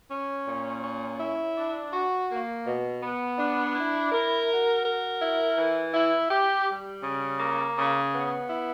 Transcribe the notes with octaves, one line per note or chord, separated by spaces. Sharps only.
C#4
A#2
C#4
E4
D4
F#4
A#3
B2
B3
D4
E4
A#4
F#4
A#4
E4
E3
E4
G4
G3
C#3
A#3
C#3
B3
E4